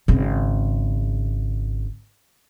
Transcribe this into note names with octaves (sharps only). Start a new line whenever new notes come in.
G#1 C#3